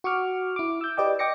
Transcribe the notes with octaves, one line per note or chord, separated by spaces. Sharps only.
F#4 C#6 D6 F6
E4 D6
E6 G6
G4 B4 D5 D#5 G5 D6
D#5 G5 D6 A#6 C#7